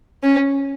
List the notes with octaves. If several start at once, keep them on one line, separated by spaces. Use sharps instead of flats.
C#4